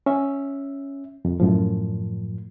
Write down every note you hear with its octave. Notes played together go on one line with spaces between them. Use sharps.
C#4 E5
F2
F#2 A2 F3